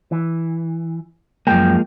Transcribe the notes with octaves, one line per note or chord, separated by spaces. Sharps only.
E3
F#2 F3 G#3 A#3 G5